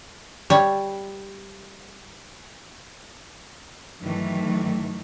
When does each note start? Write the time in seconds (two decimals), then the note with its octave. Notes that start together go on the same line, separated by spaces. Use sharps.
0.50 G3 C#5
4.01 G2 D#3 E3 F#3 A3